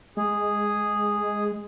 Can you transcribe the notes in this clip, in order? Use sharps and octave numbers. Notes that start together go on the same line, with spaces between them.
G#3 G#4